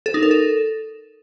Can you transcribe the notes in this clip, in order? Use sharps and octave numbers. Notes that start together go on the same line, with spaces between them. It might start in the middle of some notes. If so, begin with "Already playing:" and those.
A4
D#4
A#4
A4